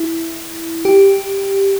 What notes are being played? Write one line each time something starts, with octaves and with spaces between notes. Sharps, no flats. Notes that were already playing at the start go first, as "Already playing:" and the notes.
Already playing: E4
G4